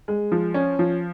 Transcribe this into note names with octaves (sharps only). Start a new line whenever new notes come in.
G#3
F3
C#4
F3